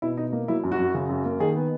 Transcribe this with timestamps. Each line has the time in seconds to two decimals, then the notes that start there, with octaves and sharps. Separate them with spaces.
0.02 B2 E4
0.17 B2 D#4
0.32 A#3
0.48 F#3 E4
0.64 F#2
0.72 F#4
0.79 F#2
0.94 C#3
1.09 F#2
1.25 A#3
1.40 D#3 G#4
1.56 B3